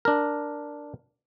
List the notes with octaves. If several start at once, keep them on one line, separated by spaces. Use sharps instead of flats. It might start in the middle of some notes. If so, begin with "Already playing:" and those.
D4 A#4